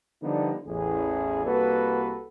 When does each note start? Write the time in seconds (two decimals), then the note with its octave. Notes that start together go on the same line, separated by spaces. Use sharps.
0.22 D3 F3 G3 B3 D4 D#4
0.66 A1 E2 G#4
1.45 C2 A#3 F#4 A4 B4